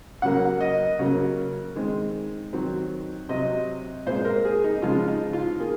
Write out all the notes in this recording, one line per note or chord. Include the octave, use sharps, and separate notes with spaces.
C#3 F#3 A#3 F#5
D#5
C#3 F#3 A#3
D#3 G#3 C4
D#3 F#3 C4
C3 F#3 C4 D#5
A#2 G#3 C4 C5
A#4
G#4
D#4
C#3 F3 G#3 C4 F4
D#4
F4
A#3 G#4